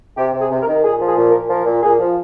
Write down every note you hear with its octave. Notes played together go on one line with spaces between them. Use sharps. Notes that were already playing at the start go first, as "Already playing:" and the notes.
C3 G4
C3 G#4
C3
A#4
D#3
A#2 G#4
F3
G#4
A#2
A#4
A#2
F3 A#4
A#2
A#2 G#4
F3